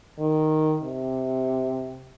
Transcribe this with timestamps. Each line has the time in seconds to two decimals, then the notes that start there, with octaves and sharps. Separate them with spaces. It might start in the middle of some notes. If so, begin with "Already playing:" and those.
0.19 D#3
0.83 C3